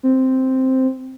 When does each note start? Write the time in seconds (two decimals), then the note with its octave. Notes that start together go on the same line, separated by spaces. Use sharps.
0.03 C4